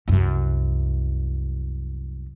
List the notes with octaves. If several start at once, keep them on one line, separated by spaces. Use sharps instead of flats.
C2 F#2